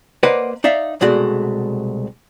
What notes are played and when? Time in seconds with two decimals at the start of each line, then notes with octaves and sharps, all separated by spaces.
0.23 A#3 B4 C5 D5 D#5 F#5
0.64 D#4 D5 E5 F5
1.01 C2 B2 G#3 A3 F#4 D5